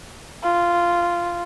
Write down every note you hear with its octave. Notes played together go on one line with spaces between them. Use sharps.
F4